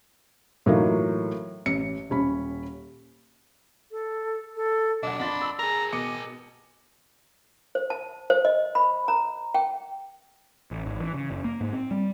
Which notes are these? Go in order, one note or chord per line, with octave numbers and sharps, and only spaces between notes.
A2 E3 F#3 A#3 D#4 F4
A1 C#7
D#1 C#4 B5
A4
A4
B1 D4 D#5 F#5
F2 B5 C6 A6
E6
G#4 A#4 A#5
B2 D#5 D6 C#7
C5
A5
C5
D#5
B5
A#5
G5
A1
G#1
E3
C#3
F#1
A#3
G#2
C4
G3